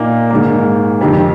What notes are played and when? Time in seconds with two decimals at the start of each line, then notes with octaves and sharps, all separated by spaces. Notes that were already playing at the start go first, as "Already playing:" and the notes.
Already playing: A#2 A#3 D#4
0.30 G#2 D#3 A#3
1.01 F2 C3 D#3